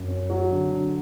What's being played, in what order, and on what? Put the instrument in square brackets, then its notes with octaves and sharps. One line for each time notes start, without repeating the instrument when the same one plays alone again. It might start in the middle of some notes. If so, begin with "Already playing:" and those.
Already playing: [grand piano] F#2
C#4
F#3
D3
D3